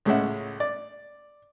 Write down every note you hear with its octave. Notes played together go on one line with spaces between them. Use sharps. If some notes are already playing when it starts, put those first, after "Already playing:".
C#2 A2 G#3 C#4 E5 F#5
D5